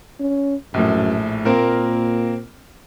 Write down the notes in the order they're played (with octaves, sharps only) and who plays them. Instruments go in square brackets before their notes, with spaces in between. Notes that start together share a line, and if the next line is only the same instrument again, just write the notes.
[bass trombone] C#4
[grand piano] A#1 A2 [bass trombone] F#2
[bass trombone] A#2 [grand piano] A#3 C4 A#4